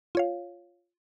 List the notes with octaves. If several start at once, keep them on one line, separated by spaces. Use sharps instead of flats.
F4 C#5 F5